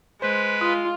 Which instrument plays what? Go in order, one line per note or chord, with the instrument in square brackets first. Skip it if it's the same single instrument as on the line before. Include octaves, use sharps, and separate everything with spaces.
[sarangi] G#3 [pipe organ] B4 [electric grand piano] C5
[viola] F4 [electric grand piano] D#6